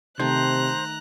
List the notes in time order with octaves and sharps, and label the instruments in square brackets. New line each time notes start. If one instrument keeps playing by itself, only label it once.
[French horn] C3 [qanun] D#3 A3 [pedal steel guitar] C5 [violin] A#5 F#6